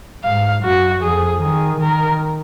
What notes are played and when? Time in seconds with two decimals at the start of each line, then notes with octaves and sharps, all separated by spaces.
0.23 G#2 F5
0.64 F#2 F#4
1.02 F2 G#4
1.42 D#3 G#4
1.81 D#3 A#4